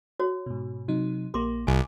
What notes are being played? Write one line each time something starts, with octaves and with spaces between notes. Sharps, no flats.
F#4 C#5
G#2 B2
C3 F#3 D#4
A#1 A#3 G4 C6 D6
C2 G#5 C#6 D6